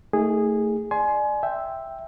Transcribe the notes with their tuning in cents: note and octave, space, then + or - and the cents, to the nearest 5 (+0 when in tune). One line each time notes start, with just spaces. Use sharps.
A3 +25 D#4 +30 G#4 -10
D5 +30 G#5 +25 C6 +0
E5 +0 G5 +0